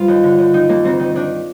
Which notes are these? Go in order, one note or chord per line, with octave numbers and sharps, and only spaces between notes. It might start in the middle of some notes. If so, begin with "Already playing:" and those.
Already playing: G2 F4 C5
D#2
D3
D#2
D#3 D#4
D#2 A#3
D2 C4
D#3
D#3 D4